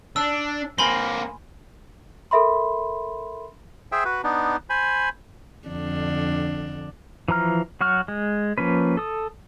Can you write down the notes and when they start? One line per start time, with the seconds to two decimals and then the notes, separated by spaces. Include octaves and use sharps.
0.16 D4 E6
0.79 A#3 C4 G#5 B5 C6
2.31 A4 A#4 E5 B5 C6
3.92 G#4 C5 E5 G5
4.05 F#4 B4
4.24 B3 D4 D#4
4.70 C5 G#5 B5
5.68 F2 D3 D4
7.28 E3 F3 A#5 F6
7.81 F#3 F#4 C#6 F6
8.08 G#3
8.58 F3 A#3 C#4 B4
8.97 A4 D#6